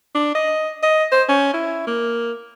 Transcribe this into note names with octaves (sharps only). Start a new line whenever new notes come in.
D4
D#5
D#5
C5
C#4
E4
A#3